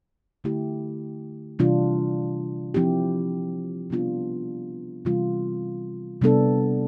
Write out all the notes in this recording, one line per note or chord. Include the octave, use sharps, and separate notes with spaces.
D3 A3 E4 G4
C3 E3 G3 D4 F4
F3 C4 E4 G4
C3 G3 B3 D4 F4
C3 E3 G3 C4 F4
C3 G3 B3 D4 A4